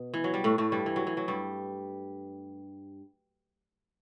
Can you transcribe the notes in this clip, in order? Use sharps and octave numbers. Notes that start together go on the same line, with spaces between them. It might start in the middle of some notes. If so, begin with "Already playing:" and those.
Already playing: B2
E3
F#3
G3
A2 A3
A2 A3
G2 G3
E3
F#3
E3
F#3
G2 G3